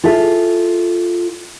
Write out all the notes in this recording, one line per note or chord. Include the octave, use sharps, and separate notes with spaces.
F4 G#4 A4 E5